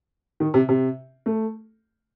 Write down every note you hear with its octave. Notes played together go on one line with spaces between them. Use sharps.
D#3
C3
C3
A3